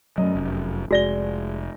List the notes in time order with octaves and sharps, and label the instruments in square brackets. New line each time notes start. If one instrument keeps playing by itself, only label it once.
[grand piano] F#2 D#5 [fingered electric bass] F#3 A3
[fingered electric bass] F1
[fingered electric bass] F1 [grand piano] G#3 A#6 G7 [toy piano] F#4 D5